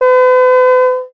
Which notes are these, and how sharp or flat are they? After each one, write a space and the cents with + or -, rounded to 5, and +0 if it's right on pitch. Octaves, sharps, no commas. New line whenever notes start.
B4 +45